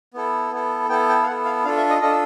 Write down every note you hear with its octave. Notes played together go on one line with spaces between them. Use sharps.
B3 E4 A4
B3 E4 A4
B3 E4 A4 G5
G5
F5
B3 E4 A4 F#5
F5
D4 F4 A4 F5
E5
D#5
D4 F4 A4 D#5